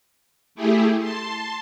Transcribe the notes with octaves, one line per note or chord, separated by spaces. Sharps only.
A3 E4 G4 G#4
A5 C6